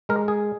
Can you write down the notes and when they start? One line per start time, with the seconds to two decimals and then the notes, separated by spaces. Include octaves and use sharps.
0.09 G#3 A#4
0.28 G#4